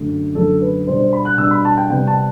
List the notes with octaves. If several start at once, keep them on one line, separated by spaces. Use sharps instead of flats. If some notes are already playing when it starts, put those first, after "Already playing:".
Already playing: F#2 D3 F#3 A3
F#2 D3 F#3 A3 A4
B4
B2 G3 D4 C5
C5
B5
F#6
B2 G3 D4 E6
B5
A5
G5
C3 G3 B3 G5
A5